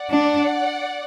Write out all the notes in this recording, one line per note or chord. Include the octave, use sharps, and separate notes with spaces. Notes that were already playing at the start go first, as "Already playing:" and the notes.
Already playing: D5 F#5
D4